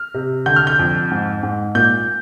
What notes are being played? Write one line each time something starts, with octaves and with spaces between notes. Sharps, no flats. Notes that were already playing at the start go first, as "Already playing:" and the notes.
Already playing: F6
C3
D3 G6
F6
G6
F2
G#2
G#2
A#2 G6